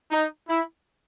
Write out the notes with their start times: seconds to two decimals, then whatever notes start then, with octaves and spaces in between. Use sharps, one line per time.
0.11 D#4
0.49 E4